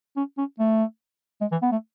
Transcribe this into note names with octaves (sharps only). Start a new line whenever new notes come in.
C#4
C#4
A3
G#3
E3
B3
A3